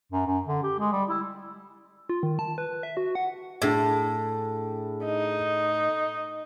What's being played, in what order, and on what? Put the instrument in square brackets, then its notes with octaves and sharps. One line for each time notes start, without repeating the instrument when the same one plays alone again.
[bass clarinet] F#2
F#2
D3
G4
G#3
G3
E4
[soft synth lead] F4
D#3
A5
B4
E5
F#4
F#5
[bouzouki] A2 [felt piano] D4 G#4
[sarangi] D#4